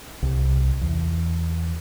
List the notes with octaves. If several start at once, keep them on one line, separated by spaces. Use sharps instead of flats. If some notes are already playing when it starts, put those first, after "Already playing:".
C2
E2